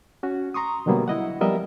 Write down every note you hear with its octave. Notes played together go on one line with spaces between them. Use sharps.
C#4 F#4
A#5 C6 C#6 D#6
B2 D3 F#3 G3 A#3 B3
E4 D#5 F#5
F3 G3 B3 A#4 D#5 E5